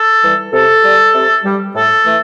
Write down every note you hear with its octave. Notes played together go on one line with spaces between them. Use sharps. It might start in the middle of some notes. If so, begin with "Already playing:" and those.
Already playing: A4
E3 G3
C3 A4
G3
C3
G3
A2 A4
E3 A3